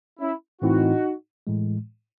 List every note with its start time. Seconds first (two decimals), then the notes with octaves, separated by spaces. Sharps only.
0.19 C#4 E4
0.62 A2 E3 C4 D#4 E4 F#4
1.47 A2 E3 G#3